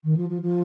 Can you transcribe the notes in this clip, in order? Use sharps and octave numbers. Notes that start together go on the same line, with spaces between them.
D#3
F3
F3
F3